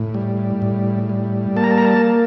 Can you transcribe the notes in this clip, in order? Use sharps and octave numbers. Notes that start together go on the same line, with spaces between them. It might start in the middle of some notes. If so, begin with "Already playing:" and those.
Already playing: A2
G3
A2
G3
A#3 A5
A#5
A5
A#5
A5